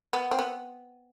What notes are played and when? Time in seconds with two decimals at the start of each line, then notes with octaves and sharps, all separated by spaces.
0.13 B3
0.31 C4
0.39 B3